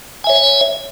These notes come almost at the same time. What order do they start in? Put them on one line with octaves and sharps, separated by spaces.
G#5 E5 C#5